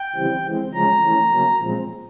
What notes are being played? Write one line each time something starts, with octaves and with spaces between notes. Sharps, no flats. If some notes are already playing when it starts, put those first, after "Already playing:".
Already playing: G5
C#3 E3 G3 C4
E3 G#3 C4
C#3 F3 G#3 C#4 A#5
E3 A3 C#4
C#3 F#3 A#3 C#4
A#2 F3 G#3 C4